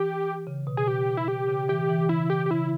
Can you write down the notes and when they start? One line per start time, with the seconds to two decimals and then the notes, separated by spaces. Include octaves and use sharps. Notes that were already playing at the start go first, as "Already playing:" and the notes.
Already playing: E3 G4
0.47 C#3
0.67 B2
0.77 G#4
0.88 G4
1.17 E4
1.28 G4
1.48 C#3
1.68 E3 G4
1.89 E3
2.09 C#3 E4
2.30 G4
2.46 G4
2.51 C#3 E4